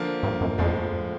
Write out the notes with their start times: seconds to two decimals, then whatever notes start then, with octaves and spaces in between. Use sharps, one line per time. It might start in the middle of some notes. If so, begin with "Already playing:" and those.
Already playing: D3 F3 A#3
0.23 G2
0.41 F#2
0.58 F2 A2 F3 G#3